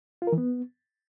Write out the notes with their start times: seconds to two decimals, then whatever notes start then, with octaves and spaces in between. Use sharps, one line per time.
0.22 F4
0.27 A#4
0.32 E3
0.38 B3